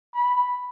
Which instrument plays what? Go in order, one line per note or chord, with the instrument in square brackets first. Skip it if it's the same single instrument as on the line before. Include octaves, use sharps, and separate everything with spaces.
[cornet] B5